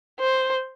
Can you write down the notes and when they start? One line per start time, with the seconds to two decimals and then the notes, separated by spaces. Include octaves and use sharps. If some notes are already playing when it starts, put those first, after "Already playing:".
0.20 C5